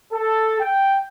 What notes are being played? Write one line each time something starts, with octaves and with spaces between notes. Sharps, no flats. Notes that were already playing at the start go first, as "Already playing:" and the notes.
A4
G5